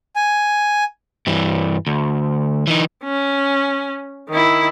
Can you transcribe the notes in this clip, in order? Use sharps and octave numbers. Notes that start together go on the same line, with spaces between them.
G#5
G2 E3
D2
E3 D#4
C#4
D#3 E4